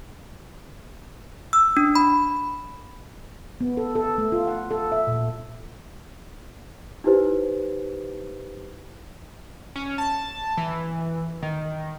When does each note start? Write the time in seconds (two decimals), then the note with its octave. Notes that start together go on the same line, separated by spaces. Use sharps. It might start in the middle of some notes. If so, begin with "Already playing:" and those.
1.53 E6
1.77 D4
1.95 B5
3.61 B3
3.77 A4
3.95 A4
4.18 A3
4.32 F4
4.47 F#5
4.71 A4
4.92 E5
5.07 A#2
7.04 D#4 E4 G4 B4 C5
9.76 C#4
9.98 A5
10.57 E3
11.43 D#3